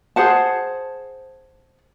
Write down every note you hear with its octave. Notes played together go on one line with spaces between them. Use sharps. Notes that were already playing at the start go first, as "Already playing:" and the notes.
G#4 C5 F#5 A5